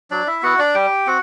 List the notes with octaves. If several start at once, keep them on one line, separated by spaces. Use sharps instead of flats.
F#3 D4 D5
E4 E5
B3 E4 F#4 F#5
D4 D5
G3 G4 G5
C4 F#4 F#5